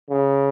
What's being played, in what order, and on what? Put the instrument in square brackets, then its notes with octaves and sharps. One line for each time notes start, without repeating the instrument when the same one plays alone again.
[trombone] C#3